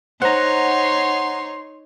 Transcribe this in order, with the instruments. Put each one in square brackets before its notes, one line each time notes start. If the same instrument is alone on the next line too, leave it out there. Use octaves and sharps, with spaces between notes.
[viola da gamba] D#4 C#5 [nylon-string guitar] C5 [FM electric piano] F#5 A#5 [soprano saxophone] C6